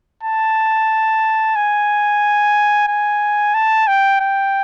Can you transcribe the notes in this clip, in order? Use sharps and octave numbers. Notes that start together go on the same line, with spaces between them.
A5
G#5
G#5
A5
G5
G5